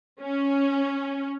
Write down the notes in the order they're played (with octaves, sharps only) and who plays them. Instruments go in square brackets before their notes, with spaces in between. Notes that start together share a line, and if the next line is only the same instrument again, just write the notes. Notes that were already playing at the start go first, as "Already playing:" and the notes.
[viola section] C#4